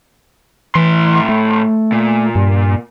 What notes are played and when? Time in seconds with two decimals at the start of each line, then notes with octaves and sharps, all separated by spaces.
0.75 A2 E3 C6
1.29 A3
1.92 A#2
2.35 G2